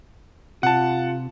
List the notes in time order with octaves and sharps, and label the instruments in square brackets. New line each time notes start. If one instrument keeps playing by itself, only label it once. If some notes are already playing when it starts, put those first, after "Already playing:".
[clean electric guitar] C3 [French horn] F4 [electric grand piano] F#5 A5